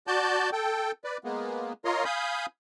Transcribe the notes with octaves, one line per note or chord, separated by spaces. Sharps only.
F#4 D5 A5 G6
A4 G5
B4 D5
G#3 A#3 B3
F4 A#4 C#5 D#5 A#5 C6
F5 G#5 B5 D#6 G6